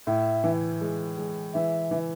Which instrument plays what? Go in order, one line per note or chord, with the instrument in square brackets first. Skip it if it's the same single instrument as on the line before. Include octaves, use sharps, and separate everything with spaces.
[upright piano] A2 [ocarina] E5
[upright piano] E3
G#3
G#3
[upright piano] E3 [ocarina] E5
[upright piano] E3